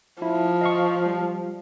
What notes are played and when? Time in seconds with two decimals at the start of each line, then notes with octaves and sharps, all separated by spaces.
0.22 F3 E4
0.61 D#5 F5 C#6
1.06 G3